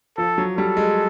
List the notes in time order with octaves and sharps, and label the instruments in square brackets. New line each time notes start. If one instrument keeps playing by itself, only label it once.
[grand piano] F3 [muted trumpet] A4
[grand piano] F#3
[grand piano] G3 [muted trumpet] A4
[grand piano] G#3